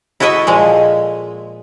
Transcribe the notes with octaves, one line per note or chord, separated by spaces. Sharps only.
E4 F#4 A4 D#5 E5
A#2 F3 G#3